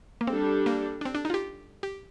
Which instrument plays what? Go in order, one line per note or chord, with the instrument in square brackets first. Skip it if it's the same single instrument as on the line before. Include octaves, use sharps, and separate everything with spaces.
[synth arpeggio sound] A#3
[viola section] G3 D4 A4 [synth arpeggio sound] C4
[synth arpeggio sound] A#3
D4
C4
D4
D#4
F4
G4
G4